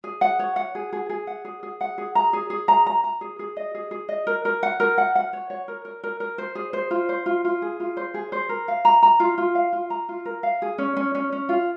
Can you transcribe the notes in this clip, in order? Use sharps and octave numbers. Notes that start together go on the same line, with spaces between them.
G#4
F#5
C#5
F#5
G#4
G#4
G#4
F#5
G#4
G#4
F#5
G#4
A#5
G#4
G#4
A#5
A#5
A#5
G#4
G#4
D#5
G#4
G#4
D#5
A#4
A#4
F#5
A#4
F#5
F#5
C#5
C#5
A#4
A#4
A#4
A#4
C5
G#4
C5
F4
C5
F4
F4
G#4
F4
C5
G#4
C5
A#4
F5
A#5
A#5
F4
F4
F5
F4
A#5
F4
A#4
F5
G#4
C#4
C#4
C#4
C#4
F4